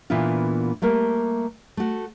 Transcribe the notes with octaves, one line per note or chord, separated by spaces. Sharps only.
A#2 E3 B3 D4 E4 F4
G3 A3 A#3 A#4
A3 F#4